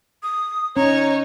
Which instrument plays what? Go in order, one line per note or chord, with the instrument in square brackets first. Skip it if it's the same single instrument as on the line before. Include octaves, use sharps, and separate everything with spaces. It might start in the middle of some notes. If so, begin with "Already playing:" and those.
[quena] D#6
[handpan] C#4 [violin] D#4 C#5 [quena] A#5